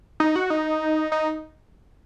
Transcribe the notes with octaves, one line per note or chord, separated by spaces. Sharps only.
D#4
F#4
D#4
D#4